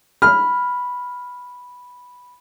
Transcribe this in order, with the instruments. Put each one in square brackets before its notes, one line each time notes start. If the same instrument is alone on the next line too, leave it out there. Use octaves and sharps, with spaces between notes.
[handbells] B5 [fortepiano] F6